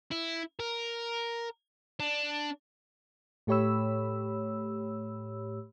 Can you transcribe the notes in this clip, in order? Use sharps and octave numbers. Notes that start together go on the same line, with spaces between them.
E4
A#4
D4
A2 A3 G4 C#5 B5 E6